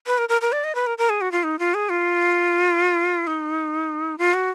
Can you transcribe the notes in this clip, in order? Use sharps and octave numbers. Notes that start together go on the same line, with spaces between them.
B4
A#4
A#4
A#4
D5
D#5
B4
A#4
A#4
G#4
F#4
F4
D#4
F4
G#4
F4
D#4
F4
F#4